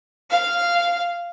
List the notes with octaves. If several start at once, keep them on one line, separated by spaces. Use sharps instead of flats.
F5